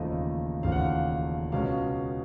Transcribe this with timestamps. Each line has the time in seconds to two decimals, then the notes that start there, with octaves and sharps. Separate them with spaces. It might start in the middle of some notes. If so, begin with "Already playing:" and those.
Already playing: E1 D#2 C#3 F3 A3 D#5
0.63 E1 D#2 C#3 F3 A3 F5
0.72 F#5
0.79 F5
1.52 C#2 B2 G#3 C#4 F5